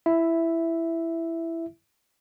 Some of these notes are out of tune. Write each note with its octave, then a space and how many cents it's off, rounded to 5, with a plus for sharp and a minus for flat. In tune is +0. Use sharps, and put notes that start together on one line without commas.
E4 +10 E5 +0